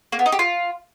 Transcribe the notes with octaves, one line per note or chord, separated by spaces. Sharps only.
A#3
B3
D#4
G4
F4